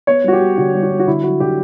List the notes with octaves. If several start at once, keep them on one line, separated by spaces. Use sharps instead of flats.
B3 C#5
G3 F#4
G4
G3
D3 F#4
G3
F#4
G3
F#4
D3 E4
F#3 F#4
D3 G4